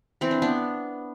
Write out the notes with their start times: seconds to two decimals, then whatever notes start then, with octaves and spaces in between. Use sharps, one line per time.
0.21 E3 C4
0.31 D4
0.42 B3 D4